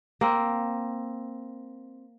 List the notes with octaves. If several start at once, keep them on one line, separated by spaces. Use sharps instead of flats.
A#3 C4